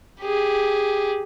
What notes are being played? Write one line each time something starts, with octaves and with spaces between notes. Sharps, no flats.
G4 G#4